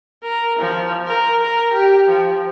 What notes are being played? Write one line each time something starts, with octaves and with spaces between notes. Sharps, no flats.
A#4
F3
A#4
A#4
G4
F3